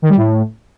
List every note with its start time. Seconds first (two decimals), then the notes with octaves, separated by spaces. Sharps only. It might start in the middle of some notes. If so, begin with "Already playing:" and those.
0.02 D#3
0.09 G3
0.17 A2